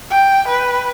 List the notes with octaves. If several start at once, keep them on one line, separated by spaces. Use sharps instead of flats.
G5
B4